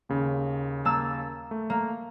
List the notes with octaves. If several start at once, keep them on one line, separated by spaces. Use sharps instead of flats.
D#2 C#3
A#3 A5 E6
A3
A#3